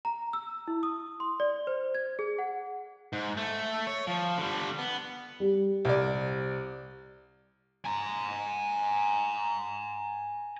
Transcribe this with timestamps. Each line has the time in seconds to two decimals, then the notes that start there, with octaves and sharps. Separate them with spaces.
0.05 A#5
0.33 E6
0.68 E4
0.83 D#6
1.20 C6
1.40 D5
1.67 C5
1.95 G#6
2.19 G#4
2.39 F#5
3.13 G#2
3.37 A3
3.87 C#5
4.07 F3
4.37 D3 G3
4.79 B3
5.40 G3
5.85 C2 D5
7.85 G#5 A#5